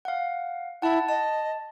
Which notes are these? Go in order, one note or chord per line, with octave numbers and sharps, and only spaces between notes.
F5 F#5
E4 F#5 A5
D#5 A5